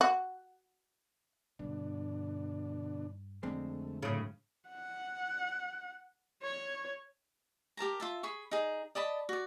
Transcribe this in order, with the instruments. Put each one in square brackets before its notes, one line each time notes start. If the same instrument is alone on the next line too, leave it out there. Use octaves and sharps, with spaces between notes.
[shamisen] F#4
[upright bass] G2 [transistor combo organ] B2 D3 D4
[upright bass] F2 [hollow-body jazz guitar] D3 G#3 C4 [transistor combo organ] A3
[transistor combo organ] F#2 [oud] A2 C#3
[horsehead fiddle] F#5
C#5
[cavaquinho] G4 A#4 A5 A#5
F4 E5 A5
G#4 B5 C#6
D#4 G#4
D5 D#5 A5 B5
F#4 D5